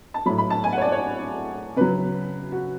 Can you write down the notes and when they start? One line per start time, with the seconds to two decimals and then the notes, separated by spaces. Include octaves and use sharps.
0.14 A5
0.26 A2 F#3 B5
0.38 B5
0.50 A5
0.64 G#5
0.73 F#5
0.78 C#5
0.82 D5
0.92 C#5
1.76 C#3 F#3 B4
2.52 F#4